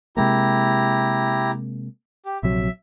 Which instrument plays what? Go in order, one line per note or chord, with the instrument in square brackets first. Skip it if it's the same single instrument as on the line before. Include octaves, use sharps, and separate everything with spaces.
[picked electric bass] C3 G#3 A#3 [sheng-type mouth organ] E4 G4 A#5
[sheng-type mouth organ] G4
[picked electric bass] A#1 C3 F#3 [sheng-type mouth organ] E5